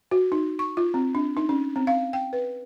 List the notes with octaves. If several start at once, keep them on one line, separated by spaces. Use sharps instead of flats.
F#4
D#4
C#6
F4
C4
D4
D#4
C#4
C4
F5
G5
B4